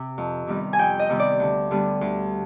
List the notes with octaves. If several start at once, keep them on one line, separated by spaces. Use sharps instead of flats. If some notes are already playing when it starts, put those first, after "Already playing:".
Already playing: C3
F2
C3 D#3 G3 B3
G#5
F2 G5
D#5
C3 D#3 G3 B3
D5
D2
D3 G3 B3
D2